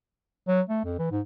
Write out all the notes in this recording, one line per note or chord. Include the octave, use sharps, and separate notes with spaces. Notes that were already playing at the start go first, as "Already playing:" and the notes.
F#3
A3
F2
E3
G#2